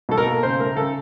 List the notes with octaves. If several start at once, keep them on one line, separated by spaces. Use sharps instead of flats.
B2 A4
A#4
A#3
C#3 C5
A3 A#4
C#3 A4